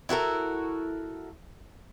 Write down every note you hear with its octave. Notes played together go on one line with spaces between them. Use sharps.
E4 F#4 A4 A#4